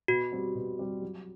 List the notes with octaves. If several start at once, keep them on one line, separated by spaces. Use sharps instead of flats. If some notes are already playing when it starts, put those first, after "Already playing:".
B2 F#4
G3 C4 G4
B2
G3 C4 G4
F#3